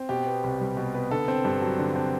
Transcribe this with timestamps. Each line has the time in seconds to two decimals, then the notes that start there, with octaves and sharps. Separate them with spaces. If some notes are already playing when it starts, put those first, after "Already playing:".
Already playing: C4
0.09 B2 G4
0.27 B3
0.44 C2
0.60 G3
0.77 B2
0.94 B3
1.11 D3 A4
1.28 C4
1.45 G2
1.61 F#3
1.79 D3
1.96 C4